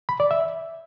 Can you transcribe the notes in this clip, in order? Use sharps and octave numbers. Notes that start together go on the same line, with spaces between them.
B5
D5
E5